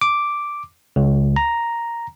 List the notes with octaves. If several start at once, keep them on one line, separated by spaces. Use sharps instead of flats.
D6
C#2
A#5